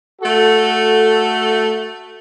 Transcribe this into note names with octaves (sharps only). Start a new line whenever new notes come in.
A3 F#4 A4